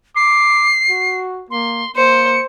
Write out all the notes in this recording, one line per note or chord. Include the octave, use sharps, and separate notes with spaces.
D6 C7
F#4
A#3 C6
A#3 C5 C#7